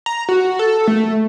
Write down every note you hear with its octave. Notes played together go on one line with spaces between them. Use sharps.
A#5
F#4
A4
A3